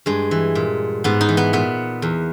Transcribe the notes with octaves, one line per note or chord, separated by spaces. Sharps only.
G2 G#3
E3
A#2
G#2 B3
D#4
E3
B3
A#2 B3
E2